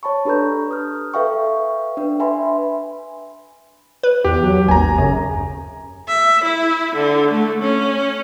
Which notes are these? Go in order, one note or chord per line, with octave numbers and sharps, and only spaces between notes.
C#5 A5 B5 C#6
D4 G4 A4 B4 A#5 G6
D#6 F6
A4 B4 E5 F5 G5 C#6
D4 B4 G5
B4 E5 G#5 B5 C6
B4
E2 G4
F#3
G#1 D#2 G#5 A#5
F#2 C#3
E5
E4
D3
A3
C#4